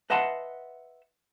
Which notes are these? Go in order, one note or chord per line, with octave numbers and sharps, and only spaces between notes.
B4 D#5 E5 F#5 A5 C6